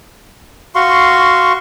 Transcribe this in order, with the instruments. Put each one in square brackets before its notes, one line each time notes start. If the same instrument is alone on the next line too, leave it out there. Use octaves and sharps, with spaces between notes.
[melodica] F#4 F5 C6 C#6